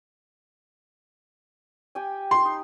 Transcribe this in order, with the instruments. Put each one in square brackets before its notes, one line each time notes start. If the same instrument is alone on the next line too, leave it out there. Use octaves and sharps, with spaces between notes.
[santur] G4 G5 G#5
[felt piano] C6
[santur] D#4